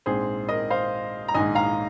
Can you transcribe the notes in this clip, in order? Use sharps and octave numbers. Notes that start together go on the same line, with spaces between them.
A#1 G#2 G#3 C4 G#4 C5
A#4 D#5
C5 F5
A#5
A#1 G#2 D#3 G#3 D#5 G#5
F5 A#5